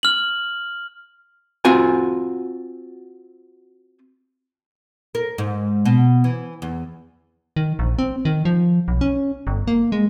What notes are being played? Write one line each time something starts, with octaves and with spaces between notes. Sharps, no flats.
F6 F#7
C4 F4 F#4 G#5
A#4
G#2
B2
E3
E2
D#3
A#1
C4
D#3
F3
B1
C#4
G1
A#3
G#3